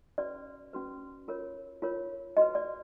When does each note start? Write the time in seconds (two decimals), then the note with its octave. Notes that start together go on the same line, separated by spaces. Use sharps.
0.18 C#4 F#4 B4 D5
0.73 C#4 F#4 B4
1.28 F4 A#4 C#5
1.82 F4 A#4 C#5
2.37 F#4 B4 D#5
2.55 D5